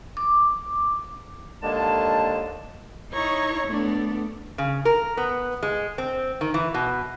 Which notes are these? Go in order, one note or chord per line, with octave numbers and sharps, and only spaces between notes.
D6
D#2 D3 G#3 A#3 A5
D#4 E4 C#5 A#5 C#6
A3 B3 D4
C#3
A#4
B3
G#3
C4
D#3
E3
B2